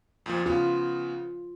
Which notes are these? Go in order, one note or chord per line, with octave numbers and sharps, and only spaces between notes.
F2 A#2 F3
C#3 B3 F4